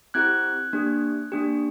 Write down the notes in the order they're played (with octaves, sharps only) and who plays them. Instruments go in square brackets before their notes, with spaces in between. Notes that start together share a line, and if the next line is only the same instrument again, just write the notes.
[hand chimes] C4 E4 G4 F#6 G#6
A#3 D4 G4
A#3 D4 G4